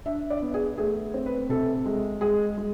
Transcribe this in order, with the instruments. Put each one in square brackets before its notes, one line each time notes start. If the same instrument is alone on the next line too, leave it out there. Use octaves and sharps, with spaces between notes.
[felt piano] D4 E5
D5
B3
G#4
A3 G#4
C4
B4
C3 A4
G#3
G#3 G#4
G#3